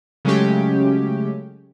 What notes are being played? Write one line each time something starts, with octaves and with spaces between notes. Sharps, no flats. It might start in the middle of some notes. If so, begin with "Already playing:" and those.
C#3 F#3 G#3 A3 C#4 G4